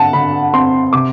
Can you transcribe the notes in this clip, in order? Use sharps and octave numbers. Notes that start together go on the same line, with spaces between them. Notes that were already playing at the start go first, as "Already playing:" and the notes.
Already playing: D3 F#5 A5
D3 B5
C4 C6
C3 D6